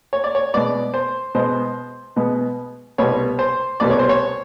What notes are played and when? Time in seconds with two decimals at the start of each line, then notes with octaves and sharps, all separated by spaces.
0.13 C#5
0.24 D5
0.35 C#5
0.54 B2 G#3 B3 D5
0.94 C5
1.35 B2 G#3 B3 C5
2.16 B2 G#3 B3
2.98 C2 B2 G3 B3 C#5
3.39 C5
3.80 C2 B2 G3 B3 D5
3.90 C#5
3.99 C5
4.09 C#5